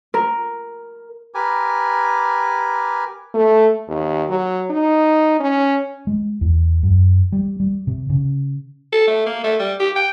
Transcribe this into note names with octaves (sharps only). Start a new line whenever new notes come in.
A#4
G4 A#4 B4 G#5
A3
D#2
F#3
D#4
C#4
G#3
E2
F#2
G3
G3
C3
C#3
A4
A3
A#3
A3
G3
G4
G5